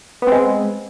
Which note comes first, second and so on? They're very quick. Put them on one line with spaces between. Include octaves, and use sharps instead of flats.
B3 C4 G#3